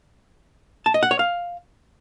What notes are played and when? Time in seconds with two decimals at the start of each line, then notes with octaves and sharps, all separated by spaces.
0.86 A5
0.94 D#5
1.03 F#5
1.11 C#5
1.19 F5